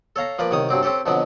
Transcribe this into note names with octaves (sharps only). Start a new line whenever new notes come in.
A4 C#5 F5 A#5
F3 A#3 B4 D5
C2 D#3 C#5 D#6
G2 F#3 C4 D6
C4 C#4 G4 A4
F2 B2 D3 F#3 B3